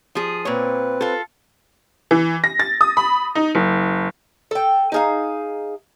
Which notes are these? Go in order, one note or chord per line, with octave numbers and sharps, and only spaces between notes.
F3 G#4
A#2 C4 B4 C#5
F4 A4
E3
A#6
A6
D#6
B5
D#4
F#1
A4 G5
D#4 G#4 F5